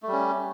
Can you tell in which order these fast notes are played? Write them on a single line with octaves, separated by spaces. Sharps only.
A3 G3 C#4